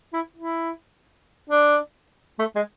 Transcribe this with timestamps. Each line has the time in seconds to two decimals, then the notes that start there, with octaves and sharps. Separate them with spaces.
0.13 E4
0.36 E4
1.50 D4
2.39 A3
2.55 G#3